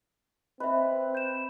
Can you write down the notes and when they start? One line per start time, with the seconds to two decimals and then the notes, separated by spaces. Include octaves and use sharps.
0.60 C4 B4 D#5 E5
1.15 G6 E7